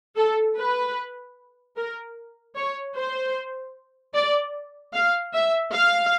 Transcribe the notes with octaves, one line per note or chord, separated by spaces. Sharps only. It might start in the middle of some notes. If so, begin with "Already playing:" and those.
A4
B4
A#4
C#5
C5
D5
F5
E5
F5